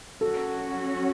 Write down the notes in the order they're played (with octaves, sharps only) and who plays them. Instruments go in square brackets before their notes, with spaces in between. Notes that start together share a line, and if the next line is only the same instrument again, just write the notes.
[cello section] F#3 C#4 F#4 [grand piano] A4